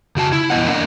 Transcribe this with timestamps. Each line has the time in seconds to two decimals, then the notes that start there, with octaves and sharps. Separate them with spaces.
0.16 C#3 F#4 A5
0.32 E4
0.50 E2 E3 B3 D#5 F#5
0.66 A#3 D4 D#5